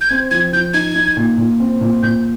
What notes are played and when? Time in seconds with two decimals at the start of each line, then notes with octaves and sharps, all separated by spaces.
0.01 G6
0.09 C4 G#6
0.31 F3 G#6
0.53 F3 G6
0.74 D#4 G#6
0.96 D#4
1.17 A#2
1.38 A#2
1.60 C4
1.81 A#2
2.03 A#2 G6